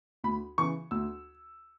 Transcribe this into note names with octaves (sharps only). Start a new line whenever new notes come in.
D2 B5
C#3 E3 C#6
D2 E6